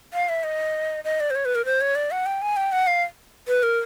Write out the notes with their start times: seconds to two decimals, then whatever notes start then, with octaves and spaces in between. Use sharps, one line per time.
0.14 F5
0.29 E5
0.44 D#5
1.04 D#5
1.20 D5
1.30 C5
1.35 C#5
1.45 B4
1.55 A#4
1.65 C5
1.81 C#5
1.95 D5
2.11 F#5
2.26 G5
2.42 G#5
2.57 G5
2.72 F#5
2.87 F5
3.48 B4
3.63 A#4